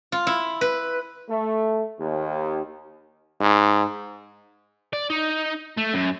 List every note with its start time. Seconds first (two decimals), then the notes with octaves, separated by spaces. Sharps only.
0.12 F4
0.27 E4
0.61 B4
1.29 A3
2.00 D#2
3.41 G#2
4.93 D5
5.10 D#4
5.78 A3
5.94 F#2